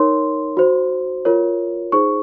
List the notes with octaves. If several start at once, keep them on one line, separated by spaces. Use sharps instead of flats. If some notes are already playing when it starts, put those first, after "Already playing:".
Already playing: D#4 A#4 C#5 C6
F#4 C5
F4 A#4 C#5
D#4 G#4 C5 C#6